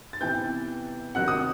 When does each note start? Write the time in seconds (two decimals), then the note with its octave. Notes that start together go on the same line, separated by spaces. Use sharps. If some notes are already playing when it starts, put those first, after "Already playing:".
0.13 A6
0.21 C3 E3 B3 G5 G6
1.15 C3 D#3 F#3 F#5 F#6
1.28 D#6